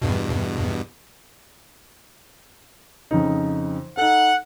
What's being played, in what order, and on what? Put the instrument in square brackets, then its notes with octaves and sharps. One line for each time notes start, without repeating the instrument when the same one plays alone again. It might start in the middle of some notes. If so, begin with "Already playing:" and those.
[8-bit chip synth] E2 G2 B2
[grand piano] F2 C#3 D#4
[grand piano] D#4 A4 [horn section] F#5